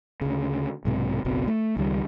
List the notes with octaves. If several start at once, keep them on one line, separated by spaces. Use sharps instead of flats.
D2 C#3
B1 G#2 C3
F#1 B1 B2 C4
A3
C#2 D#3 E3 G3